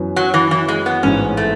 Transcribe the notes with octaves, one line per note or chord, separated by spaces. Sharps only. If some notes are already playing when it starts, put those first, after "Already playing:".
Already playing: F#2 E3 B3
F#3
E3
E3
G#3
B3
A1 G#2 G#3 B3 C#4 E4
A3